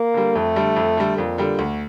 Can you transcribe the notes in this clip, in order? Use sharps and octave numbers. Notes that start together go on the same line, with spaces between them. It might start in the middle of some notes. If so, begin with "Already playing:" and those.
Already playing: A#3
D3 G3
F2 A3
D3 G3
F2
D3 G3
F2 A#2
D3 G3
D2